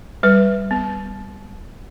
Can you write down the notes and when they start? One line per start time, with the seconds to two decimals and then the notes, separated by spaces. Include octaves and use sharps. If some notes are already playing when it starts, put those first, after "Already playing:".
0.23 G3 B4
0.71 B3